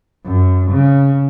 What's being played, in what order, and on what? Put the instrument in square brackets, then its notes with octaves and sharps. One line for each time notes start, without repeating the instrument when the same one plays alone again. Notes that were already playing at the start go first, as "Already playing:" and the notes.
[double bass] F#2
C#3